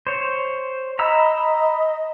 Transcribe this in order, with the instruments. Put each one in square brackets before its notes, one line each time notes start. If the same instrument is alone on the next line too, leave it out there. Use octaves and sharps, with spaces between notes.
[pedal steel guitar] C5 C#5
[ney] D#5 [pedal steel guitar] A#5 B5 E6